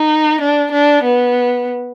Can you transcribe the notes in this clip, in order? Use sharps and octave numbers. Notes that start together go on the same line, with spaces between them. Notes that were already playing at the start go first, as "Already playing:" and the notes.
Already playing: D#4
D4
D4
B3